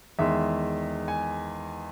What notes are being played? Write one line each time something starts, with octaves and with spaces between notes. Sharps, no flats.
E2 D#3 G#3 E5
G#5